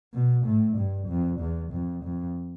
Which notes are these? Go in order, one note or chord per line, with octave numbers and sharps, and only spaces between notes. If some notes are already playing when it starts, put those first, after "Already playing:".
B2
A2
G2
F2
E2
F2
F2